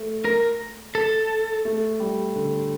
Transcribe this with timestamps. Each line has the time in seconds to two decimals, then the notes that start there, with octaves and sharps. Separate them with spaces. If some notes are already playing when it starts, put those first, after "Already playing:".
Already playing: A3
0.25 A#4
0.95 A4
1.65 A3
2.00 G3
2.36 D3